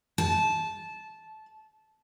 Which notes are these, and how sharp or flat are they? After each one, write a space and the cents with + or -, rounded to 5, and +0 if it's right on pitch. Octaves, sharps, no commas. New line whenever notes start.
A5 -15